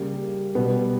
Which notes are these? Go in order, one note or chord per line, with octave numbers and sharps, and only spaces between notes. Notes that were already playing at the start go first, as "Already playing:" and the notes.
Already playing: C#3 G3 A#3
B2 G3 B3